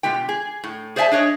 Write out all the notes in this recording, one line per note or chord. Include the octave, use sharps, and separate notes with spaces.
B2 G#3 F4 G4 G5
G#4
A2
G#4 C5 D5 E5 G#5 A5
D4 G#4 C#5 D#5